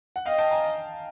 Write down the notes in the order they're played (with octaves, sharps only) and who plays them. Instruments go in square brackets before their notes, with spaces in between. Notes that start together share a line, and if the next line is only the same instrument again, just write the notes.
[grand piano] F#5
[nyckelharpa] D#5 [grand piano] F5 G5
[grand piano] G5 A5
G#5 A#5